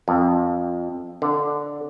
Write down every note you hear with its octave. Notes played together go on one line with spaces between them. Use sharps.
F2
D3